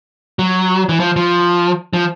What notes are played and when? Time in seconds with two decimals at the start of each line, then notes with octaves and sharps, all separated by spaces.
0.39 F#3
0.89 E3
1.00 F3
1.16 F3
1.93 F3